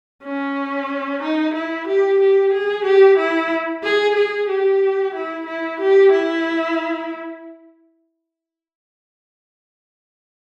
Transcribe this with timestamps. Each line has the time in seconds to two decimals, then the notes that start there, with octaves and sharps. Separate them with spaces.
0.24 C#4
1.22 D#4
1.54 E4
1.88 G4
2.20 G4
2.53 G#4
2.85 G4
3.18 E4
3.84 G#4
4.16 G#4
4.49 G4
5.14 E4
5.47 E4
5.80 G4
6.12 E4